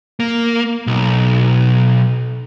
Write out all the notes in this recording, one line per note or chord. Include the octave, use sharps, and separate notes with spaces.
A#3
B1